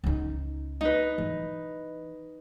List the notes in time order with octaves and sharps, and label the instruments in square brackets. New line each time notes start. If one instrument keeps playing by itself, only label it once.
[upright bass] C#2 D#4
[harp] D#4 B4
[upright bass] E3